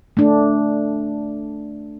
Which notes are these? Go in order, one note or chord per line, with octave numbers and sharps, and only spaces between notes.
A3 D4